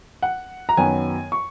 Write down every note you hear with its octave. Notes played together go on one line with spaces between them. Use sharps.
F#5
A#5
F#2 D#3 F#3 B3 G#5
C#6